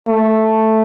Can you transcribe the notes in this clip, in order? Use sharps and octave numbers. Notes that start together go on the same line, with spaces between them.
A3